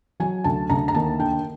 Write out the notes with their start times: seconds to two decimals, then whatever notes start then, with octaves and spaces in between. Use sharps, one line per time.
0.20 F#3 G#5
0.44 D2 A5
0.70 D2 A#5
0.88 A#5
0.94 D#2 A5
1.19 D3 G5